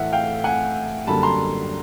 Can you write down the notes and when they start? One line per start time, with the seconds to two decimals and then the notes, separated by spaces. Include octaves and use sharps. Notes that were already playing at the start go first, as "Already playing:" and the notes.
Already playing: A2 E3 A3 E5 F#5
0.12 F5 G5
0.44 F#5 G#5
1.07 F#2 D3 G3 A#3 A5 B5
1.23 A#5 C6